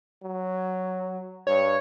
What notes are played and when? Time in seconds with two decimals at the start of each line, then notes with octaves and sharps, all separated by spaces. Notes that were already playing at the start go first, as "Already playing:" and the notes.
0.23 F#3
1.47 G2 C#5